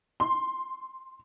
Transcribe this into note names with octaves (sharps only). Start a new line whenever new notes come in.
C6